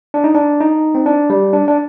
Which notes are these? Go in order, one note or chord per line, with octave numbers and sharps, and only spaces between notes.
D4
D#4
D4
D#4
C4
D4
G3
D4
D4